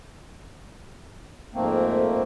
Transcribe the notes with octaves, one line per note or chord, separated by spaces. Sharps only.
F2 G#2 A3 A#3 C4